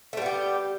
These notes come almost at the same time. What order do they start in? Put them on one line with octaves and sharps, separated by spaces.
A3 G3 B3 G4